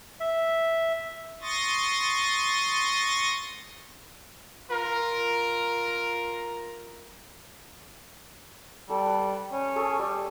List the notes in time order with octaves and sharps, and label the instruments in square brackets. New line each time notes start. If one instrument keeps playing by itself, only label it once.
[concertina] E5
[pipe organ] C6 C#6 D#6 A6 A#6
[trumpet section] F4 A#4
[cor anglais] G3 [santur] A4
[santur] B4
[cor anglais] C#4
[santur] G#4 A4 C#5
G3